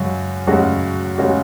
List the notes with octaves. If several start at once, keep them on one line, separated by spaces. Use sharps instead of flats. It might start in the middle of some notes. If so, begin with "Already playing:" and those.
Already playing: F#2 C#3 G#3 C#4 F#4
F#2 C#3 G#3 C#4 F#4
C#3 G#3 C#4 F#4